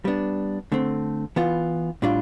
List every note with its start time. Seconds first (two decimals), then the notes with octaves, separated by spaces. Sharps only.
0.05 G3 B3 D4
0.72 D3 A3 C4
1.36 E3 B3 F4
2.02 A2 G3 D4 F4